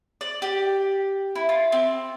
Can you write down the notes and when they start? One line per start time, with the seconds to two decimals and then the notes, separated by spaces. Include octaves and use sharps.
0.21 D5
0.42 G4
1.35 E4
1.49 F4
1.72 C4